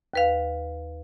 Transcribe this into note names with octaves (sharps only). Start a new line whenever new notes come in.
D#2 B4 F5